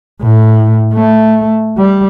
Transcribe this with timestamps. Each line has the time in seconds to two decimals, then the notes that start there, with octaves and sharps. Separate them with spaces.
0.22 A2
0.94 A3
1.78 G3